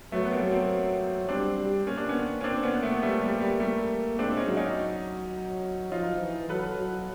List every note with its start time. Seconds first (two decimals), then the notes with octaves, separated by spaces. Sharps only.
0.12 F#3 A3 B3
0.25 B3
0.32 A#3 C4
0.41 F#3
0.51 A#3 C4
1.29 G3 C4 D4
1.58 G3
1.87 A#3 C#4
1.97 D4
2.09 B3 C#4
2.41 C#4
2.44 A#3 C4 D4
2.63 B3 C#4
2.83 A3 B3
3.02 G3 A3
3.21 G3
3.40 G3
3.60 G3 A3
4.19 G#3 C4 D4
4.37 C#4 D#4
4.47 F#3
4.57 C#4 D#4
5.92 F3 D#4 F4
6.21 E3
6.49 F#3 A4 B4
6.79 F#3